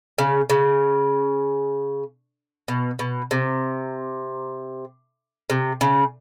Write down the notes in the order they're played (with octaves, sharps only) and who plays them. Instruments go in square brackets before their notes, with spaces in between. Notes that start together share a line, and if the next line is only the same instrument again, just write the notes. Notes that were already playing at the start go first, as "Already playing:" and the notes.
[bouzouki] C#3
C#3
B2
B2
C3
C3
C#3